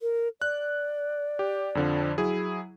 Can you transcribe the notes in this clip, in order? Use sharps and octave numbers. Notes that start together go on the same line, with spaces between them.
A#4
D5 F#6
G4
F2 D3 F3
F#3 E4 G#4